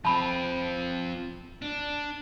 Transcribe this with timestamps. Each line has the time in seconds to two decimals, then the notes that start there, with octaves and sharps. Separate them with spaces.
0.05 F3 C4 A5 B5
1.62 D4